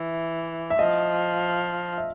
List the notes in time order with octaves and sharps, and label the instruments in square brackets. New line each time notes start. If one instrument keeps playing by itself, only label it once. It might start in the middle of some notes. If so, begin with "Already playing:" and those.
Already playing: [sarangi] E3 [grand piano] E5
[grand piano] E5
[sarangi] F3 [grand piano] D#5
[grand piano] E5